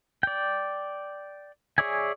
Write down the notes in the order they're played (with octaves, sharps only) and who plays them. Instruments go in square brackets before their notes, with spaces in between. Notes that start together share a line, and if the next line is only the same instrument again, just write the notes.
[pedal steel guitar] D5 G5
G#4 C#5 D5 E5 G#5